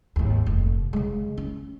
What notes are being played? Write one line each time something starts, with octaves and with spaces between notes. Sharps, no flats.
G#1 D#2
F1
C#3 G#3
C#4